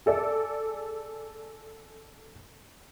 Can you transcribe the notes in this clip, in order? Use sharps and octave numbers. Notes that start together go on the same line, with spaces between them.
G#4 A4 D5